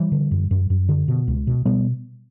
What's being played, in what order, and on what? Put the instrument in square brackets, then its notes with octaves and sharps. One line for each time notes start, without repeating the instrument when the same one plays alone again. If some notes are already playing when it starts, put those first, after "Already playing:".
Already playing: [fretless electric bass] E3 G3
D3
F#2
F#2
F#2
D3
B2
C#2
B2
B2 G3 B3